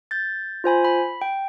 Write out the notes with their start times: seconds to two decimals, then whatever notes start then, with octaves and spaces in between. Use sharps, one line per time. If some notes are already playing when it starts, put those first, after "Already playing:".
0.11 G6 A6
0.64 F4 C5 G#5 B5
0.84 B5
1.21 G5